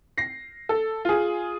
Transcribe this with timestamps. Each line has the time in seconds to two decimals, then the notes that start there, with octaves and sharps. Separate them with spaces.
0.18 A#6 C7
0.69 A4
1.05 F4 G#4